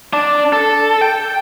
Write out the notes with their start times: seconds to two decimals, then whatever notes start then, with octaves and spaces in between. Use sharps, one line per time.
0.13 D4
0.53 A4
1.01 G5